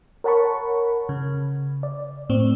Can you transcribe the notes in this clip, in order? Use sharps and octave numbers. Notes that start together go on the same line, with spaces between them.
A#4 C#5 F#5 A5 B5 C#6
C#3
D5
A2 C4